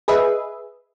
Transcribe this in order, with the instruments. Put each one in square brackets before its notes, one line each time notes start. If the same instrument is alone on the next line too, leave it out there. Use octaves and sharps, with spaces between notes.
[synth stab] G#4 B4 D#5 E5